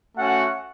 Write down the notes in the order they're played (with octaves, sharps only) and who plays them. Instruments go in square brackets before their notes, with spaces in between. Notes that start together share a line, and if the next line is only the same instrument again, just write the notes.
[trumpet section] A3 C#4 F#4 F#5